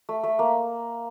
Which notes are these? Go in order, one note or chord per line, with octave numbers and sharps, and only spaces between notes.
A3
A3
A#3